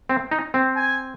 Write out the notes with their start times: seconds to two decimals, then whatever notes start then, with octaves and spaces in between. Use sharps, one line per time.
0.09 C4
0.31 D#4
0.54 C4
0.76 G#5